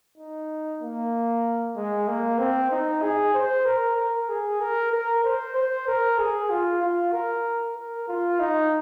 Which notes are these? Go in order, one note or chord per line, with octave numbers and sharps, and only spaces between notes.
D#4
A#3
G#3
A#3
C4
D#4
G#4
C5
A#4
A#4
G#4
A#4
A#4
C5
C5
A#4
G#4
F4
F4
A#4
A#4
F4
D#4